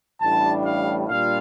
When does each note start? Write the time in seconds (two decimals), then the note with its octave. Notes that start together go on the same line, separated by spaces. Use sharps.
0.21 A1 A2 G3 D4 A5
0.65 F5
1.09 A#2 G3 D4 F4 F5